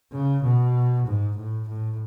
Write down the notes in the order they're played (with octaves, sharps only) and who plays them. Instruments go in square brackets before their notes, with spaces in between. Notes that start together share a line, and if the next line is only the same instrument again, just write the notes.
[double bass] C#3
B2
G#2
A2
A2